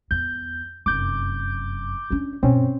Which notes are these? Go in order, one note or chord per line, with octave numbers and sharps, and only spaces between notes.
E2 G6
F1 F#2 D6 G6
C#4 D4
G2 B2 C4 C#4